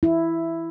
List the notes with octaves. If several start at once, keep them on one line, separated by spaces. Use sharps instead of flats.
E4